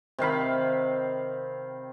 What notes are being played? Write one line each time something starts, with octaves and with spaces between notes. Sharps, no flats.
C3 D#3 F5 B5